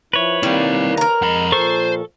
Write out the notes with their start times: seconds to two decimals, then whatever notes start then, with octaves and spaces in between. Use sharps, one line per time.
0.13 F3 E4 B4 C#5
0.43 D#3 G3 A#3 C4 E4
0.97 A#4 A#5
1.22 F2 G#3 B5
1.52 A#2 F3 A4 C5 C#6